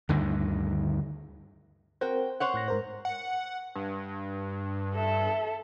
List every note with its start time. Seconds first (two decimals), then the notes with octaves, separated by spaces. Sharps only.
0.09 D2 G2 D3 D#3
2.01 C4 F#4 A#4 C5 G5
2.40 C5 C#5 F#5
2.54 A2 F#6 A#6
2.68 G#2 A#4 C5
3.05 F#5
3.75 G2
4.95 A4 E5